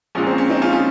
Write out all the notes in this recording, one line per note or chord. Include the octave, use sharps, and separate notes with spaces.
A#1 A#2 G#3 C#4
C4
C#4
C4 D#4
C#4 F4
C#4 F4